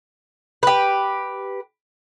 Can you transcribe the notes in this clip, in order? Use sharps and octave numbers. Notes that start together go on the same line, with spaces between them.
G4 B4